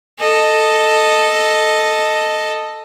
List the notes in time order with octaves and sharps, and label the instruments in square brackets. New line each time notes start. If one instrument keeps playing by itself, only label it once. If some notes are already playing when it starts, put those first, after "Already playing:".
[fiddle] A4 D#5